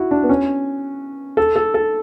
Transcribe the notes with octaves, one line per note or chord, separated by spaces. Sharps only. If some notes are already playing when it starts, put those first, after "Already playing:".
Already playing: E4 F#4
D4
B3
C#4
A4
A4
A4